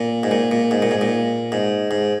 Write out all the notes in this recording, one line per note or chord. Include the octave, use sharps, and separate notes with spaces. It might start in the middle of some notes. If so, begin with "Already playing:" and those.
Already playing: A#2
G#2
A#2
A#2
G#2
A#2
G#2
A#2
G#2
G#2